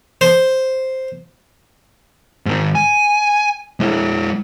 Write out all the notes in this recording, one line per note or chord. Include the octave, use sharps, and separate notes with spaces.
C5
G#2 D#3
G#5
G#3 E4